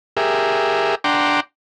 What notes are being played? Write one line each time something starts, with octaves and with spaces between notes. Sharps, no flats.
G4 G#4 A#4 E5
D4 F#5 G5 A#5 C6 D6